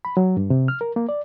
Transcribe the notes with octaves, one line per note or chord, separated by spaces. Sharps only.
B5
F#3
G2
C3
F6
A#4
A#3
D5